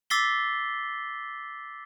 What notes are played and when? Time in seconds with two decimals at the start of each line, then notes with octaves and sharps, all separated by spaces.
0.10 D6 E6 A6 B6 C7 G7